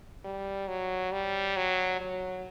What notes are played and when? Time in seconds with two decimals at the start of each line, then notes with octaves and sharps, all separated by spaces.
0.25 G3
0.68 F#3
1.12 G3
1.57 F#3
2.00 F#3